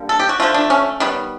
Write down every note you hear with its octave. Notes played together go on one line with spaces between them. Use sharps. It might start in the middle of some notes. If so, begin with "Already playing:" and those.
Already playing: D3 G3 A#3
A4
G4
F#4
D3 F3 A3 F4
D4
C#4
D#3 G3 B3